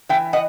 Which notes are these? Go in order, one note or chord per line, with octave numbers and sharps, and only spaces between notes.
E3 E5 G5
D#5 F#5